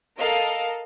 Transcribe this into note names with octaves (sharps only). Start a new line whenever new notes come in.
A4 A#4 D#5 F5